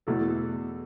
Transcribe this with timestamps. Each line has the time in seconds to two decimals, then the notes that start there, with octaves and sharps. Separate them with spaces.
0.07 E2 B2 A3 E4 A4